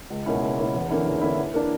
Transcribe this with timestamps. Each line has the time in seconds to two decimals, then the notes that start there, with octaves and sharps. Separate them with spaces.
0.10 C#2
0.26 B2 A#3 C#4 E4
0.41 C#2
0.58 B2 A#3 C#4 E4
0.75 E2
0.90 D3 A#3 C#4 E4
1.06 E2
1.21 D3 A#3 C#4 E4
1.38 E3
1.54 A#3 D4